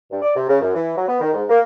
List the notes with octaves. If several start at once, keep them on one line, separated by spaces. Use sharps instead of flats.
G2
D5
C3
C#3
F#2
E3
F#3
B3
D#3
G#2
A#3